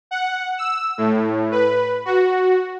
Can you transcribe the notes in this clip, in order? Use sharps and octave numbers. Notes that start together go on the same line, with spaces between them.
F#5
E6
A2
B4
F#4